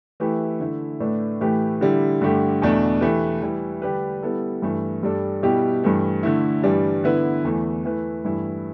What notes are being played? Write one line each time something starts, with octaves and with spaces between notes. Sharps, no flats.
E3 A3 E4 G4 B4
D3 A3 E4
A2 A3 D4 B4
A2 E3 A3 G4 B4
D3 G3 E4
G2 D3 A3 G4
E2 B2 A3 D4
E3 A3 G4 B4
E3 G3 E4
D3 G3 D4 G4 B4
G3 B3 E4 A4
G2 E3 A3
G2 G3 D4 A4
B2 G3 E4 G4
G2 E3 A3
D3 A3 E4
G2 E3 G3 D4
D3 B3 E4 B4
E2 E3 A3
E3 A3 E4 B4
G2 E3 A3 E4